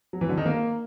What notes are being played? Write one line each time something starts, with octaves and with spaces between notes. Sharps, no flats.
F#3
E3
D3
D#3
A#3